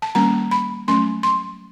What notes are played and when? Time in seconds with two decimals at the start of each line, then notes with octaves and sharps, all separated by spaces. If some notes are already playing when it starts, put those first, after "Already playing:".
0.02 A5
0.15 D#3 G3 A#3 C#4 A#5
0.51 B5
0.88 F#3 A3 C#4 C6
1.23 C6